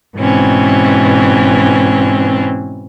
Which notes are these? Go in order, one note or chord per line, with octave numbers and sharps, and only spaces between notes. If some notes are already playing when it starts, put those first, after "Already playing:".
G#2 B2 E3 C4 C#4